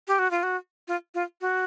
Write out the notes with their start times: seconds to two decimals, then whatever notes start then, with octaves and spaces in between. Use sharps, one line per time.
0.08 G4
0.19 F#4
0.31 F4
0.43 F#4
0.88 F4
1.14 F4
1.41 F#4